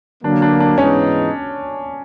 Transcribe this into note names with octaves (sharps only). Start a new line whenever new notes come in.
D3 F#3 A#3 D4
D4
D4
G#2 E3 G#3 B3 C#4 D#4